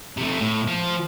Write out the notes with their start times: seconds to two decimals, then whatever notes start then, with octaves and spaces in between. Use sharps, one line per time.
0.17 C3 A3
0.41 A2
0.68 F3